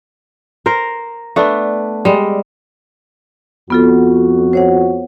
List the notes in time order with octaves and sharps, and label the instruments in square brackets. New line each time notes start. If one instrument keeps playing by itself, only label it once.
[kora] A#4 C5
A3 B3 D4
G3 G#3
[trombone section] F2 F#4 [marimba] B3 F4 A4
[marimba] C5 C#5 F#5